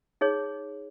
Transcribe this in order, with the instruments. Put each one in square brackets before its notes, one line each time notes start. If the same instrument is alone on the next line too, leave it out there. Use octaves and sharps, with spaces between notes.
[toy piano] D#4 G#4 C#5